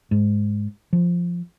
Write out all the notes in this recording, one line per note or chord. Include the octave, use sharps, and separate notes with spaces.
G#2
F3